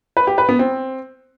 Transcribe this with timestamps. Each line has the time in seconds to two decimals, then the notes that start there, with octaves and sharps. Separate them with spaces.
0.17 B4
0.27 G4
0.38 B4
0.49 B3
0.59 C4